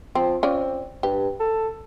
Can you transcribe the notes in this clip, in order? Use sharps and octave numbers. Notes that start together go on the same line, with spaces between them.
F3 C4
C4 C#4 F4 D5
G2 G4
A4